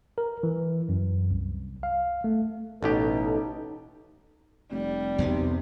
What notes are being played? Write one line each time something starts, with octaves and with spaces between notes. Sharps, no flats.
A#4
E3
F#2
C2
F5
A3
A1 B2 D#4 G4 A4
F1 G3
B1 E2 C3 A3 B3